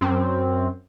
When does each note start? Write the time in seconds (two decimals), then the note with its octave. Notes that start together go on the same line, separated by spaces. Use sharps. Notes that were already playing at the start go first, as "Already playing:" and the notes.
0.01 F#2 C4